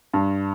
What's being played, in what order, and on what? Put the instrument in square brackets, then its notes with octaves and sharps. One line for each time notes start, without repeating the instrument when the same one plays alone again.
[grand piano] G2